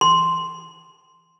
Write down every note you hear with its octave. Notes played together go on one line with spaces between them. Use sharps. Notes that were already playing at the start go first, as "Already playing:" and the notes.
C6